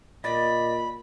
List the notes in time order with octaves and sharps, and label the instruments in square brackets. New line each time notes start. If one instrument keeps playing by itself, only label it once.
[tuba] A#2 [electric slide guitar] D5 D#5 [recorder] B5